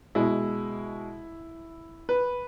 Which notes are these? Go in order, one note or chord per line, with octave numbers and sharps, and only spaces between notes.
B2 G#3 E4
B4